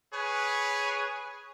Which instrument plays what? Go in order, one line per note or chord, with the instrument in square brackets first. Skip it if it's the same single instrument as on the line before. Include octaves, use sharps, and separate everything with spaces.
[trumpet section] G#4 B4 C#5 G#5